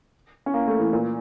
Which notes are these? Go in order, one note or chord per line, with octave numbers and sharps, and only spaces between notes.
C#4
A#3
A3
E3
A#2